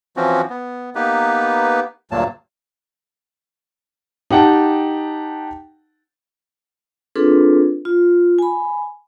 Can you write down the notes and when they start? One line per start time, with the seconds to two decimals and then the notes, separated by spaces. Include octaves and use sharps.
0.17 E3 F3 C4 C#4 F#4
0.50 B3
0.95 A#3 B3 D#4 G4 B4
2.11 D2 G2 A#2 F#3 A#3 A5
4.31 D#4 G4 F#5 G5 A5
7.16 C4 D4 F4 G#4 A4 B4
7.85 F4
8.39 G#5 B5